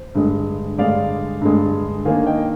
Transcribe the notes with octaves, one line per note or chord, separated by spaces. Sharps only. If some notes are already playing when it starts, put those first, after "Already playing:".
Already playing: C5
G2 D3 G#3
G2 D3 G#3 D5 F5
G2 D3 G#3
D#3 A#3 D4 F5 G#5
D#5 G5